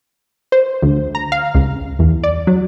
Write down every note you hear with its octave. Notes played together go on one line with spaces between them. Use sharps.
C5
D2
A#5
F5
C#2
E2
D5
F#3